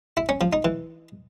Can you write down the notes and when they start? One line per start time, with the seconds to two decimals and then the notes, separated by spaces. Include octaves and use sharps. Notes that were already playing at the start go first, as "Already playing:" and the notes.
0.17 E4
0.29 C#4
0.41 F3
0.53 D#4
0.65 E3